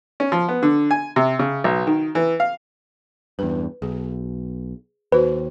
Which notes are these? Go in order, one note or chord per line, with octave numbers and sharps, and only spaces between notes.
C#4
F3
B3
D3
G#5
C3
C#3
B1
D#3
E3
F5
E2 G2 B4
B1 G#4
D#2 F#4 B4 C5